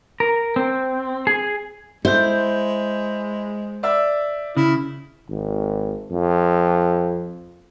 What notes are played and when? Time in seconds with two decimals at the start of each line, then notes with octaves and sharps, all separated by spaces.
0.20 A#4
0.56 C4
1.27 G#4
2.05 G#3 E4 C5 G6
3.83 D5 E5 E6
4.57 C#3 E4
5.29 G#1
6.12 F2